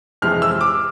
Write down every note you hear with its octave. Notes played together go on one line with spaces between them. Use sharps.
F2 C3 E3 G#3 F6
E6
D6